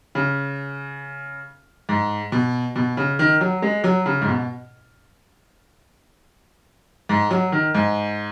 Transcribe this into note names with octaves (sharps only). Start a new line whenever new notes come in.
C#3
G#2
B2
B2
C#3
D#3
F#3
G#3
F#3
C#3
G#2
B2
G#2
F#3
D#3
G#2